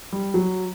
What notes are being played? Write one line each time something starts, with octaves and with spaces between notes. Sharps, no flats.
G3
F#3